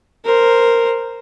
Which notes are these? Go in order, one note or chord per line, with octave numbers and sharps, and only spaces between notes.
A#4 C5